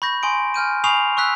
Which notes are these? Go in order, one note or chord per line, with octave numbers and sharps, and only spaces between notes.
B5 C#6 G6 A#6
G#5 C6 D#6 D7
G#5 F6 G6 D#7
G#5 B5 C#6 D#6 C7 F7
C#6 E6 F#6 B6